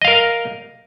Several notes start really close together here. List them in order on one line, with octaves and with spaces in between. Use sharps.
D#5 F5 A#4